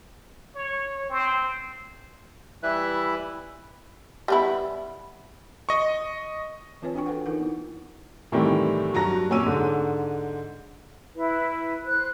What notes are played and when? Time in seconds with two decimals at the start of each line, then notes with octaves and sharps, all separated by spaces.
0.55 C#5
1.10 C4
2.63 E3 G3 E4 B4 E5 F#6
4.28 G3 B3 E4
5.69 D#5 C#6
6.82 E3 C4 F4 B4 C#5 G#5
6.94 D4 F#4 G5 G#5 C#6
7.06 A4 B4 C5 F#5
7.26 E3 D#4 F4 A#4 F#5
7.40 B3 E4
8.32 A2 C3 D#3 E3 G3 C4
8.93 G2 F#3 A#5 A#6
9.30 F2 A#2 C#4 C#5 E6 D#7
9.46 G#2 D3
11.15 E4 B4
11.85 C5 F#6